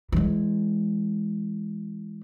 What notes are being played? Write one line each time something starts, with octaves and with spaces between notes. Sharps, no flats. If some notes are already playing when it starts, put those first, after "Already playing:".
E3 G#3